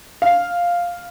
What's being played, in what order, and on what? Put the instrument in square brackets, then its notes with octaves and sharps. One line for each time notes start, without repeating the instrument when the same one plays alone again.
[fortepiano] F5